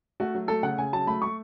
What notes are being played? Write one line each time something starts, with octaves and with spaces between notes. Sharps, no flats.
A3 F#4
F#3
A3 A4
C#3 F#5
C#3 G#5
F#3 A5
A3 B5
A3 C#6